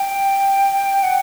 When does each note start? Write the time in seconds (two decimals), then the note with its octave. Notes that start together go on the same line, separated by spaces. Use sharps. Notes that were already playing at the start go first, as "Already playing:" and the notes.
Already playing: G5
1.03 F#5